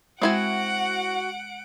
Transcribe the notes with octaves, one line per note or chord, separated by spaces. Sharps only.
G#3 C4 E4 F#4 F#5 G#5 D7